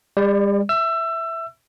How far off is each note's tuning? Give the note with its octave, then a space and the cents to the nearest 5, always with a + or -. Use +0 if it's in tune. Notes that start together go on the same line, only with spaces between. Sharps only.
G3 +45 D5 +0
E5 +0 E6 +25